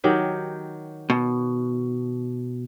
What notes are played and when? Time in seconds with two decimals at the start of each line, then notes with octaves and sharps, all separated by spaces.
0.04 D#3 F#3 G4
1.10 B2